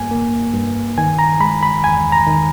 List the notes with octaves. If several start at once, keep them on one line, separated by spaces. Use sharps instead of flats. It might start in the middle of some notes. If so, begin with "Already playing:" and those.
Already playing: G2 A#3 G#5
A#3
G2
D#3 G#5
A#5
G#3 B5
B5
E2 G#5
A#5
D#3